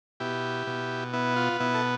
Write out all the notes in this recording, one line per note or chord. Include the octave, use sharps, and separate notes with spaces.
B2 E4 G4
B2
B3 E4
F4
B2 E4
A4